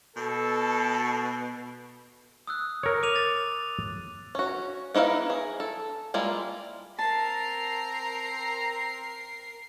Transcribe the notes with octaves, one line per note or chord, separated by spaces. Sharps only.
B2 A4
D#6 E6 F#6
A#4 C#5
D6 D#7 F7
A6
C#4 F#4
B3 D#4 E4 D#5 F5
G#4
A4
G3 G#3 A#3 E4 F4
C4 A#4 A5 A#5 C7